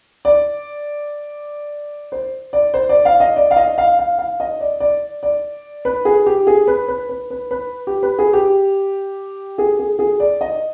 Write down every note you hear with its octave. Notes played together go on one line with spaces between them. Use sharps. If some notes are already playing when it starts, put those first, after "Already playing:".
D5
C5
D5
C5
D5
F5
D#5
D5
F5
D#5
F5
F5
F5
D#5
D5
D5
D5
B4
G#4
G4
G#4
B4
B4
B4
B4
B4
G4
B4
G#4
G4
G#4
G#4
G#4
D5
D#5